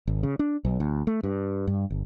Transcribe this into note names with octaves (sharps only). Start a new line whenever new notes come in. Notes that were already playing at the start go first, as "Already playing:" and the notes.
G#1
C#3
D4
B1
D2
A3
G2
G2
G1